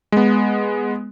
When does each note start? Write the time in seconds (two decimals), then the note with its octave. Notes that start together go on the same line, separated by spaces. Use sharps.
0.12 G#3 B3